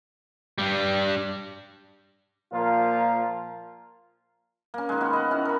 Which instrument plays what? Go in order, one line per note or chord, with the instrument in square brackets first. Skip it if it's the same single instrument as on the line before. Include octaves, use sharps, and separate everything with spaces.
[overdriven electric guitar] G2 G3
[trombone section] A#2 F3 A#3 F4 A#4
[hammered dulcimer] A#3 C#4
D#3 G#3
B3 F#4 B5
D#5 F#5
C#4 E4 F#4
A#4 B5